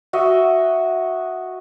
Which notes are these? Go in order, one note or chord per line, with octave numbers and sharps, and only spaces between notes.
F#4 D#5 E5